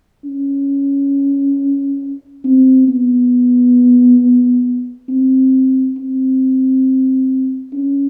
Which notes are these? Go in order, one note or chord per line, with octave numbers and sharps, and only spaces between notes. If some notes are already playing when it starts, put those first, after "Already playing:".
C#4
C4
B3
C4
C4
C#4